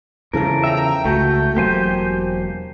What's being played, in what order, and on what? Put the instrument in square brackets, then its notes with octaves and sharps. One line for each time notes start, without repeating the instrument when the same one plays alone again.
[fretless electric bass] E2 C#3 F3 [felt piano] E3 A4 A#6 [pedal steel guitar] A#4
[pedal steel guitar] E5 A#5 [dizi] G5
[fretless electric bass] C#2 [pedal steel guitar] A3 [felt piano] F#4 A5 A#5 [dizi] G6
[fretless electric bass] E1 F#3 A#3 [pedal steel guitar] G4 C5 G#5